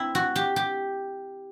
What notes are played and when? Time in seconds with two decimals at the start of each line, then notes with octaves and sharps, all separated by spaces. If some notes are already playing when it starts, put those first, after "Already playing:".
Already playing: C4 E4
0.15 F#4
0.36 G4
0.56 G4